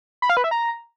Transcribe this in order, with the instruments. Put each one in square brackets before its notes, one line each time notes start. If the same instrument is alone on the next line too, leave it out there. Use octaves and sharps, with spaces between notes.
[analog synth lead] B5
F5
B4
E5
A#5